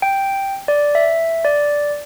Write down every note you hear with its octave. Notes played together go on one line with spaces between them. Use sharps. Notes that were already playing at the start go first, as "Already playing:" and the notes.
G5
D5
E5
D5